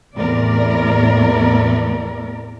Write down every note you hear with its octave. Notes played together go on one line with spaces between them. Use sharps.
E2 A2 C3 A#4 D5